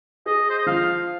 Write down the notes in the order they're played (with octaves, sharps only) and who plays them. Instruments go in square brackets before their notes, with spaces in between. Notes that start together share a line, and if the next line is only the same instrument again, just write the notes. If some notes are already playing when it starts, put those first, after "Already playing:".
[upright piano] G#4 [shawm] D#5
[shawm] C5
D#5
[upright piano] F3 [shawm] F5